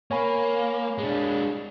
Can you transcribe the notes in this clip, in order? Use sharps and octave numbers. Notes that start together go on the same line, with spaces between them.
A#3 C#5 G#5 B5
G#3 D4